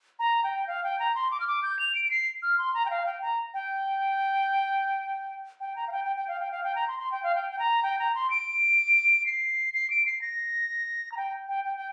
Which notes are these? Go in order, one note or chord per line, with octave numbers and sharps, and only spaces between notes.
A#5
G5
F5
G5
A#5
C6
D6
F6
D6
G6
F7
D7
D7
C7
F6
C6
A#5
G5
F5
G5
A#5
G5
G5
A#5
F5
G5
G5
G5
F5
G5
F5
G5
A#5
C6
C6
G5
F5
G5
G5
A#5
G5
A#5
C6
D7
C7
C7
D7
C7
A#6
A#5
G5
G5
G5
G5